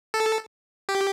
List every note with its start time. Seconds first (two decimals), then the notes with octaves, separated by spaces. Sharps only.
0.14 A4
0.89 G4